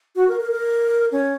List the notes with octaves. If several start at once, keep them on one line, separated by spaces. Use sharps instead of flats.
F#4
A#4
A#4
A#4
C#4